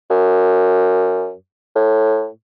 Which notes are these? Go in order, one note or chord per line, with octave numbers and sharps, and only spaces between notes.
F#2
A2